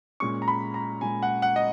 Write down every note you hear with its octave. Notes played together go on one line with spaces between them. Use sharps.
A#2 G#3 C#4 C#6
A#5
B5
A#5
A#2 G#3 C#4 G#5
F#5
F#5
D#5